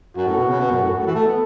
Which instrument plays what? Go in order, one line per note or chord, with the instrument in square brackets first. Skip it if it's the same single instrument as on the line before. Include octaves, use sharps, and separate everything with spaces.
[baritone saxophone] F#2 [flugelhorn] F#4
[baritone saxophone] A2
B2
C#3
B2
F#2
A2
F#2
A2
E3
[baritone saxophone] A3 [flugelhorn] A4
[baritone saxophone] B3